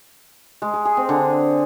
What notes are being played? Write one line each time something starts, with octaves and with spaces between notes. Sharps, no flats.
G#3
G#3
G#4
C4
D3